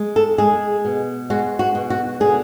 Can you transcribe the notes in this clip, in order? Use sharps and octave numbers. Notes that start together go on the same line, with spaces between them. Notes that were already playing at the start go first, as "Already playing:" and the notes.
Already playing: G#3
A4
G#3 G#4
B2
G#3 F#4
F#4
B2
F#4
D3 G#4